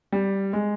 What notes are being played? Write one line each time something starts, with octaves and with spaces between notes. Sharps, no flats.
G3
G#3